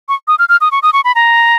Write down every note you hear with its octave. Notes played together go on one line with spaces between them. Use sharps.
C#6
D#6
F6
F6
D#6
C#6
D#6
C#6
B5
A#5